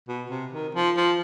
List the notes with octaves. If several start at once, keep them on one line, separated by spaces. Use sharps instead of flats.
B2
C3
D#3
F3
F3